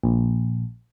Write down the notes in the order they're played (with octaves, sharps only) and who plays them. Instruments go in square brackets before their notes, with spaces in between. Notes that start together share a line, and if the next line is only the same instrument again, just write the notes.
[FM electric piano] A#1